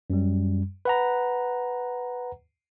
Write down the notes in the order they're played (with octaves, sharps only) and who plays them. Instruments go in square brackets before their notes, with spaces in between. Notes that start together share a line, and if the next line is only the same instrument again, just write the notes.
[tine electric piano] F#2 G3
B4 F#5 A#5